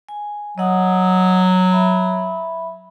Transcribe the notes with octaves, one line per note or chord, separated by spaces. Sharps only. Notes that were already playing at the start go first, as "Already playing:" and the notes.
G#5
F#3 D#5 F#5 D#6
E5 B5